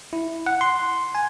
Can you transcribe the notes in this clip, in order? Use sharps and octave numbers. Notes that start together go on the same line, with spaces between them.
E4
F#5
C6
G#5